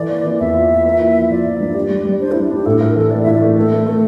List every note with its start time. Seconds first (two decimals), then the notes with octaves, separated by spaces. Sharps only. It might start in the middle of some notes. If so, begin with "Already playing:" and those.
Already playing: E3 A4 D5
0.09 A#3
0.25 E3
0.40 E2 E5
0.54 F4
0.70 F4
0.85 A#3
1.00 E4
1.15 F3
1.30 F3 D5
1.45 F3
1.60 G2
1.75 G4
1.90 G3
2.05 G3
2.20 D4 C5
2.32 E4
2.36 G3
2.44 E4
2.51 D4 G4
2.66 A2 A4
2.80 A2 A#4
2.96 E3 A4
3.11 A3 D5
3.23 A2 E5
3.33 D5
3.42 A3
3.56 A3 A4
3.72 A3
3.86 A3